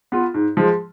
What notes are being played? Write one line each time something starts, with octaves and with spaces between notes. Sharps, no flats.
B3 F4
G#2
F3 G#3